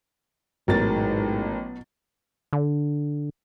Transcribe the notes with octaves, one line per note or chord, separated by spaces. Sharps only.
A1 G#2 B2 F#3 A#4 A6
D3